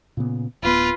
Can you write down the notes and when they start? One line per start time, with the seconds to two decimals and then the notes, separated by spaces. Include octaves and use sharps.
0.17 A#2 C#3 B3
0.62 D1 B3 F4 B4